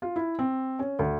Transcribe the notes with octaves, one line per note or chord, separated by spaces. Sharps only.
F4
E4
C4
C#4
D2